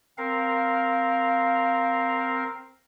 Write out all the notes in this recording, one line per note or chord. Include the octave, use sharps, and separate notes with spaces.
C4 A#4 F5